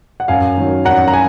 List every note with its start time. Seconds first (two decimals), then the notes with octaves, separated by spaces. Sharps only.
0.20 F#5
0.28 F#2 F5 G#5
0.58 D#3 F#3
0.85 F#2 F#5 A#5
1.08 A#5
1.14 G#5